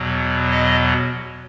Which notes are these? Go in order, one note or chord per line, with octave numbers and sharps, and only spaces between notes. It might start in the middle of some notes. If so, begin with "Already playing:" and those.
Already playing: E2 B2 F#3
D#5